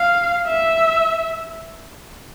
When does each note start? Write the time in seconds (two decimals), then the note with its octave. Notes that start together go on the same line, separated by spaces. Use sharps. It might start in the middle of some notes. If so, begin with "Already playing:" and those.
Already playing: F5
0.47 E5